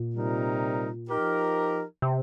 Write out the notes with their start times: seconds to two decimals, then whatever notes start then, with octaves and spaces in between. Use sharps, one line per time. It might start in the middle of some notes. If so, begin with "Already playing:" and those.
Already playing: A#2
0.15 C3 G3 D#4 A#4
1.08 F3 D#4 G4 A#4
2.02 C3